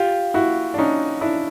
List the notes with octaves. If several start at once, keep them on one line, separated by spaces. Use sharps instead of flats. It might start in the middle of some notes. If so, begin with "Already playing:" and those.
Already playing: F4 G4
E4 F#4
D4
C#4 D#4
D4 E4